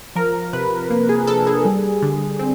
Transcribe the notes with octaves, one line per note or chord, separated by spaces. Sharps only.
F3 A#4
C3 B4
A#3
G#4
D4 A4
G#4
G3
D3
C4